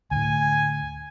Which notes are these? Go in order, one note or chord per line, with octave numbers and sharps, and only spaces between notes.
D2 A2 G#5